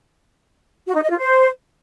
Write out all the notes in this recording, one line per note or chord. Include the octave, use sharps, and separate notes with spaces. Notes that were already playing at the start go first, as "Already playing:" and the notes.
F#4
D#4
D#5
F4
C5